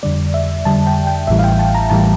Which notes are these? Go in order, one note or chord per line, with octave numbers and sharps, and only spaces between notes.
F2 D3 G3 D5
E5
F2 D3 G3 A5
G5
G5
A1 A2 E3 G3 E5
F5
G5
A5
A#5
A1 A2 E3 G3 A5